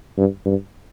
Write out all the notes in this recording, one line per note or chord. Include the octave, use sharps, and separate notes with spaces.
G2
G2